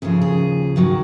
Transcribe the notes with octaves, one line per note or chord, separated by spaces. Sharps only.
D#2 C#3 F3 G#4
G#4
D#2 D#3 F#3 F#4